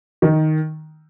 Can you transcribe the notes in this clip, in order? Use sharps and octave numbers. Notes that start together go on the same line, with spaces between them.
D#3